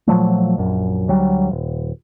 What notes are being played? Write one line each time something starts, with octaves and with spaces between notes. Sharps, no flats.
A#2 F3 F#3 A3
A#1 F#2
D2 F#3 G3
D#1